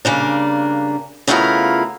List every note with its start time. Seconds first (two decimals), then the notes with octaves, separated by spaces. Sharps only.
0.05 G2 C#3 A#3 D4
1.27 C#3 A3 B3 E4 F4 A#4